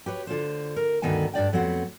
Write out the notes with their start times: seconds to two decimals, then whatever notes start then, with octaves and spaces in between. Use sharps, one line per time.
0.06 G4 B4 C#5
0.27 D3 F4 C5
0.76 A#4
1.02 D2 G2 D#3 B3 A4 G#5
1.34 G2 D4 D5 G5
1.53 F2 F#3 B3 C4 F#5